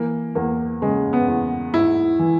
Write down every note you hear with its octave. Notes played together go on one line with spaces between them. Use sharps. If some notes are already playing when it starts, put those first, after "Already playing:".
Already playing: E3 A#3
E2 A#3
C#3 G#3
B3
E2
G#2 E4
E3